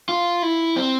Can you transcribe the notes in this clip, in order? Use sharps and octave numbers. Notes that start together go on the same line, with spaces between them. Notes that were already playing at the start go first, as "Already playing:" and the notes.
F4
E4
C4